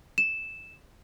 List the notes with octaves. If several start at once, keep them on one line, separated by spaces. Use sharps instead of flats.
E7